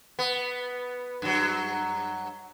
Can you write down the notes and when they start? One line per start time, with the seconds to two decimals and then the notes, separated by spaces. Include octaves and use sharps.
0.19 B3
1.22 G2 F#3